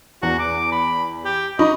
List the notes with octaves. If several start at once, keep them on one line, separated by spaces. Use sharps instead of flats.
E2 F#4
D6
B5
G4
D#4 D#5 B5 C#6